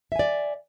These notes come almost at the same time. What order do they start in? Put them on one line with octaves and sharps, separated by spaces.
E5 G#5 D5